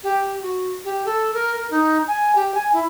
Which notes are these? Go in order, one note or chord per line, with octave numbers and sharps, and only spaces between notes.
G4
F#4
G4
A4
A#4
A#4
D#4
G#5
G4
G#5
E4